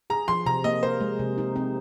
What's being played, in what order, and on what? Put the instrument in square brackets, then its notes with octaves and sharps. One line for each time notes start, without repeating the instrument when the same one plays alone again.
[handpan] G#4 [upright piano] A#5
[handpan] F3 [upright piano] C6
[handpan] C3 [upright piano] A#5
[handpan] A#3 [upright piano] D#5
[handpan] A#4 [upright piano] C5
[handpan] G#3
C3
D#4
C4